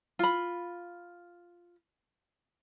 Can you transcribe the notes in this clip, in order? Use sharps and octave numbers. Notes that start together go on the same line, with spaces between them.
F4 B5